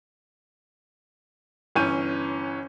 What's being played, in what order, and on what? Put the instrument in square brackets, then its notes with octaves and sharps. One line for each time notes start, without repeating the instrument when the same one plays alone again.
[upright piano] G1 E3 C#4 G6 D#7